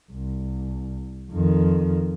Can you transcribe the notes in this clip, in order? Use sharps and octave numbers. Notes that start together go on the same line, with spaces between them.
C2
F2 D#3